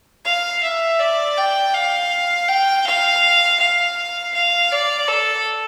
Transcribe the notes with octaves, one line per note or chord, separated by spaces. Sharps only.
F5
E5
D5
G5
F5
G5
F5
F5
F5
D5
A4